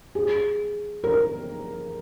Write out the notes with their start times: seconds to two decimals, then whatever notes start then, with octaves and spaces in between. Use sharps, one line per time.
0.15 G#4
1.04 A#4